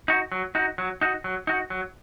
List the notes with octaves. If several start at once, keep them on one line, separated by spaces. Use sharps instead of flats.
D#4 F#4
F#3
D#4 F#4
F#3
D#4 F#4
F#3
D#4 F#4
F#3